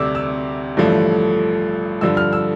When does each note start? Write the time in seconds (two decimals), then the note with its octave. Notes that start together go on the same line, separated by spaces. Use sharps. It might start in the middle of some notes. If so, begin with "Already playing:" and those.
Already playing: D2 C3 G3 D4 D6 E6
0.15 E6
0.77 A1 G2 D3 F3 A3
2.01 G2 D3 F3 E6
2.17 F6
2.33 E6